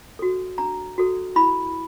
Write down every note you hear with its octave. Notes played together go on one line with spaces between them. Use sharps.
F#4 A4
D4 A#5
F#4 A4
E4 B5